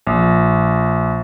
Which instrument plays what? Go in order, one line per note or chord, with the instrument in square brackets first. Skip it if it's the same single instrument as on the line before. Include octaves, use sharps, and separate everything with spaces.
[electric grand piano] A#1